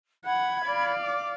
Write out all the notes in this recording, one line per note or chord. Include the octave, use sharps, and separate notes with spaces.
F#5 B5 G#6
D5 F5
D6